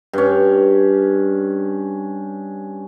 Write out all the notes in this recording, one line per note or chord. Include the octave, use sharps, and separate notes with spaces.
G2 C#4